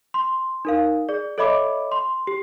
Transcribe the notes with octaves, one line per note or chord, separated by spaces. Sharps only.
C6
D#4 A#4 F5
G#4 D5
A4 C#5 D#5 E5 B5 D6
C6
G4